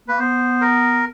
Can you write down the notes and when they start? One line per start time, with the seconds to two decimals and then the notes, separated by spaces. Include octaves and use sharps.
0.08 A#3 B4
0.19 B3 C5
0.61 A#4